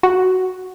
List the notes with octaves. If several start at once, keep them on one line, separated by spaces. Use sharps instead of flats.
F#4